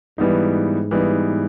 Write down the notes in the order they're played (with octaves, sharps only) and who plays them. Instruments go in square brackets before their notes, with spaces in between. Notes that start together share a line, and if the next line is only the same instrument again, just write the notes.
[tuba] G#2 [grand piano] E3 G3 B3 D#4
[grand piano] E3 G3 B3 D#4